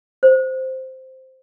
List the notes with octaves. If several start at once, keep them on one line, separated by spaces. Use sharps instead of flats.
C5